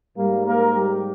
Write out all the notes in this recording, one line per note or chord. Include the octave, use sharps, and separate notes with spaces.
G#2 G3 A#3
A#3 A#4
G3 G4